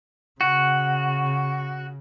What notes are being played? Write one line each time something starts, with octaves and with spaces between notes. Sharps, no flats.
C#3 F#4